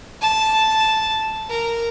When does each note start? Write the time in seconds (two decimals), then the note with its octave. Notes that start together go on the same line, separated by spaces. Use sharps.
0.22 A5
1.50 A#4